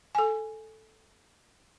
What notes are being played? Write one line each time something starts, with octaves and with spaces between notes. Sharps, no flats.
A4 G#5